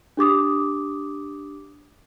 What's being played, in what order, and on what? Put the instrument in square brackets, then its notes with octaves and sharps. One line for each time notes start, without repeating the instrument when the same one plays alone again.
[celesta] D4 G4 D6 D#6